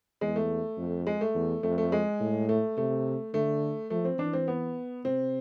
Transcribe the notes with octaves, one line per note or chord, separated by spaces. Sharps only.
E2 G#3
A3
F2
G#3
A3
E2
F2 A3
A3
G#3
A2
A3
C3 A3
D3 A3
F3 A3
C4
E3 D4
C4
B3
C3 C4